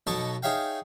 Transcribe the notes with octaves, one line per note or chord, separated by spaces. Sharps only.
B1 B2 A4 D#5 A5 C#6
D#4 G#4 C#5 E5 F5 G5